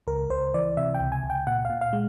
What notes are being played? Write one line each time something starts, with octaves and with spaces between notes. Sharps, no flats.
C#2 A#4
C#2 C5
E3 D5
C3 E5
G5
C#2
G#5
C#2
G5
A#2 F#5
A#2 F5
F5
G#3